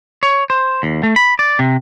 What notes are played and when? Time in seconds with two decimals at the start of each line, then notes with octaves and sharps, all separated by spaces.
0.23 C#5
0.50 C5
0.83 D#2
1.03 A3
1.16 B5
1.39 D5
1.59 C3